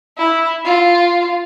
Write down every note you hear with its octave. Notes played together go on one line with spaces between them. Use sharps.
E4
F4